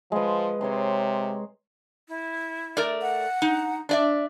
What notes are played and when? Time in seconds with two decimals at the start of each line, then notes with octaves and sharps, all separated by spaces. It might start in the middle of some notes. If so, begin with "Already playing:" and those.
0.12 F3 G#3 B4
0.61 C3 C#5 A#5 C6
2.08 E4
2.77 A3 A#4 D5
3.02 F#5
3.42 D#4
3.89 D4 D5 E5